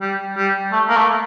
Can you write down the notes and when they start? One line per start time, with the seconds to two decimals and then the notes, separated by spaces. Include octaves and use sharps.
0.01 G3
0.37 G3
0.72 A3
0.89 A#3
0.96 A3